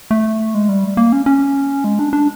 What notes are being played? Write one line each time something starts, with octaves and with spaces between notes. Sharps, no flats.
A3
G#3
G3
A#3
C#4
C#4
G#3
D4
D4